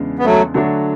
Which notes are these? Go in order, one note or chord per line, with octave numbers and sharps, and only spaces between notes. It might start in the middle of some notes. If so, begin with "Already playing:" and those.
Already playing: E2 C#3 G#3 D4
B3
F#3 A3
D3 F#3 A3 D4 F#4